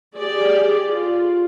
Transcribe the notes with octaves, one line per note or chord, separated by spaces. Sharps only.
G4 G#4 D5
F4